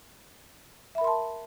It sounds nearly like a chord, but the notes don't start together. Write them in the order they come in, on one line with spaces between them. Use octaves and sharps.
E5 B5 A#4 C6 A5